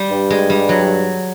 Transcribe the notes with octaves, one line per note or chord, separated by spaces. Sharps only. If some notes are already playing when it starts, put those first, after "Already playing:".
Already playing: G3
G2
G#3
G3
F#3